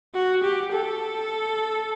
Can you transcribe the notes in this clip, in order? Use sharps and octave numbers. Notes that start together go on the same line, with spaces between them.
F#4
G4
A4